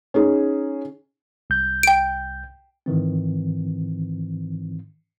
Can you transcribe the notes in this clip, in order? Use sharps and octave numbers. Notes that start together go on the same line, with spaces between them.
C#4 D#4 G#4
C2 G6
G5 D7
G#2 D#3 E3 C4